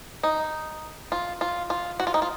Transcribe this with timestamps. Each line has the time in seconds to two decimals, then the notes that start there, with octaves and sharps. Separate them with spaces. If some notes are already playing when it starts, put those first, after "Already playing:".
0.23 D#4
1.12 F4
1.41 F4
1.70 F4
2.00 F#4
2.07 F4
2.14 D#4
2.22 F4